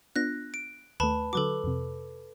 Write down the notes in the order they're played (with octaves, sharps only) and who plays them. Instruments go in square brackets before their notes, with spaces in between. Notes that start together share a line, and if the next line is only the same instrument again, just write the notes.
[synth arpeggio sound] B3 D4 F4 [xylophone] F#6 A#6
[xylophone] D7
[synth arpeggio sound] D#2 A3 [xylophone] B4 A5 B5
[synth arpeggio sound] D3 F#3 F#4 [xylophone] A4 B4 D6
[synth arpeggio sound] F2 C3